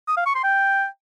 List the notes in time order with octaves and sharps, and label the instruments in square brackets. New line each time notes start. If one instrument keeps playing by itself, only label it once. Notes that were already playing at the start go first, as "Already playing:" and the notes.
[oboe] D#6
F5
C#6
C6
G5